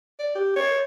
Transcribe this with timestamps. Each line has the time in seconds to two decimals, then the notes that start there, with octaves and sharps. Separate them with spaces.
0.19 D5
0.35 G4
0.56 C#5